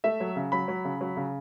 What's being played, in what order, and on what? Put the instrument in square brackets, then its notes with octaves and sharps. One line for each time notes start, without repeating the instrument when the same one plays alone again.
[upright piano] A3 [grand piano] E5
[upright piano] F#3
C#3
[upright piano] F#3 [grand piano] B5
[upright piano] F#3
C#3
F#3
C#3